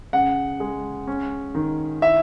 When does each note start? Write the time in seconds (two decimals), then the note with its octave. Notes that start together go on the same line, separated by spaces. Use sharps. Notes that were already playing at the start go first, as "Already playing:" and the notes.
0.13 C#3 F#5
0.60 G#3
1.07 C#4
1.55 D#3
2.02 E4 E5